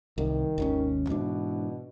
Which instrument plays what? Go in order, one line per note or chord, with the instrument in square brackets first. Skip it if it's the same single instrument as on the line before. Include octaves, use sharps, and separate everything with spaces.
[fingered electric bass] C2 [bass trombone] D#3
[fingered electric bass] G#1 D#2 C#4
[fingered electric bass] G#2 E3 D4 [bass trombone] B2